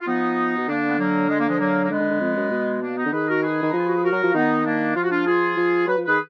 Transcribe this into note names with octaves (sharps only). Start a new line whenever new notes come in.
F4
F3 B3 D#4
B2
D3 A#3 D4
B3
F#3 A#3
G#3
A#3
F3 G#3
F#3 A#3
A#3
D3 G#3 B3
D3
D3
F2
F#2
B2
A#3 D4
B3 D#4
D3
D#3 G#4 B4
F#4 A#4
G#4 B4
D#3
D#4
F3 F4
F#4
G#4
F#4 A#4
F#3
F3
F4
D#3 B3 D#4
A#3 D4
F3 F4
F#4
D4 F4
F4 G#4
F3
F#3 B4
F3
D#3 G#4 B4